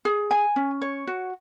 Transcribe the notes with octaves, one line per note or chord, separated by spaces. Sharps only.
G#4
G#5
C#4
C#5
F#4